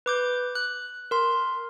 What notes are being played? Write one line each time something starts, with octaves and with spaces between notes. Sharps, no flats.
B4 D6 G6
F#6
A#4 C6